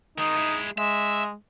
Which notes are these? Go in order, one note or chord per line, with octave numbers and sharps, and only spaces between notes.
D#3 G#3 D#4
G#3 E4
G#3 E5